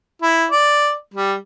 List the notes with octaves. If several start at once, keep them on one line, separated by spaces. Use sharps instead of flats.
E4
D5
G3